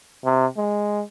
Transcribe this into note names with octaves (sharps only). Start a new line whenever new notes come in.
C3
G#3